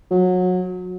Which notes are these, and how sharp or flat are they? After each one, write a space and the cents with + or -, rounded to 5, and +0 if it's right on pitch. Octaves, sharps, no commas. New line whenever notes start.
F#3 -25